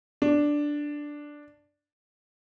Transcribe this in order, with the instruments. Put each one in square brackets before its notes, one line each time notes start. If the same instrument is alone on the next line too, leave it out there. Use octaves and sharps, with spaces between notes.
[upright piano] D4